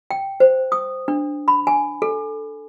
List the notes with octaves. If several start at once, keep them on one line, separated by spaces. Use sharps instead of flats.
G5
C5
D#6
D4
B5
G#5
A4